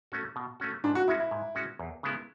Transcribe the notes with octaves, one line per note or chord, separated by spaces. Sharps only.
A3 C#4 F#4
B2
A3 C#4 F#4
G#2 D4
F#4
G#3 C#4 E4 F#4
E4
G#2
G#3 C#4 F#4
E2
C#3 G#3 B3 E4